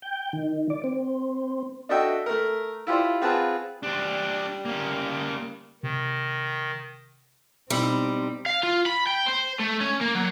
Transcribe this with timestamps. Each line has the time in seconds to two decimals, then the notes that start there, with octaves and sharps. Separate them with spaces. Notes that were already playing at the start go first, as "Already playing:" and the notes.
0.02 G5
0.33 D#3
0.70 D5
0.84 C4
1.89 D4 F#4 A4 D#5 E5 G5
2.26 A3 A#4
2.87 E4 F4 G4 C5 D5
3.22 C4 F4 G#4 B4 F#5 A5
3.83 G3 D4 C5
4.65 A#3 C#4
5.83 C3 D#3
7.70 B2 G3 B3 C4 D#4 E4 B5
8.46 F5
8.63 F4
8.86 B5
9.06 G5
9.26 C5
9.59 A3
9.81 C#4
10.01 A#3
10.15 F#3